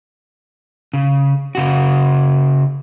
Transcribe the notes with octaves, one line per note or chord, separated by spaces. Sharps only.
C#3
C#3 F#4